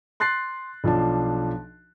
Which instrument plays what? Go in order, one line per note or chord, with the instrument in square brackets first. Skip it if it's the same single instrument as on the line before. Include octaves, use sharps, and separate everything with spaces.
[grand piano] C6 F#6 A6 C7
B1 F3 D4 A5